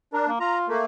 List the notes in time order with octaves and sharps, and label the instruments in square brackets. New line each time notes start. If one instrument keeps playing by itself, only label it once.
[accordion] D4 [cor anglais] A#4
[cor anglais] A#3
[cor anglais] F4 [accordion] A#5
[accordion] A3 A#3